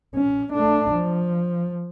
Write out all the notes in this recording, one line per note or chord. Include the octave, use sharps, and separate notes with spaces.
C#4
A3 D4
F3